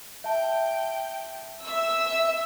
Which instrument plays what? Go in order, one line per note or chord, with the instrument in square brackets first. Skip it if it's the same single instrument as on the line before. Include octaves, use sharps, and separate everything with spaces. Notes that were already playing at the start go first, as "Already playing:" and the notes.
[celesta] E5 A5 [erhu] G5
[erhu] E5 [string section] E6